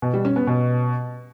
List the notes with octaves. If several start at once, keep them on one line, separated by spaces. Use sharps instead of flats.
B2
G3
C#4
B3
B2